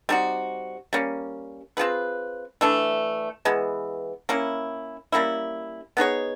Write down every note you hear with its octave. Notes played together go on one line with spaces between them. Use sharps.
G3 C4 D#4 F#4
G3 A#3 C#4
C4 F4 G#4 B4
E3 A3 D4
E3 G#3 B3
A#3 C#4 E4
G3 A#3 C#4 E4
B3 D#4 G#4 C#5